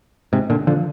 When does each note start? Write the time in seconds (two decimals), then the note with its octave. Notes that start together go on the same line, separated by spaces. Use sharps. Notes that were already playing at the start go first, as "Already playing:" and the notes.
0.33 G#2 C3
0.50 A#2 D3
0.67 D3 F3